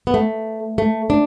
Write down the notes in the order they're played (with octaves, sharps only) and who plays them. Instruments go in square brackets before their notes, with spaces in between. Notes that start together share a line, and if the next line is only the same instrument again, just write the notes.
[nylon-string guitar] B3
A3
A3
D4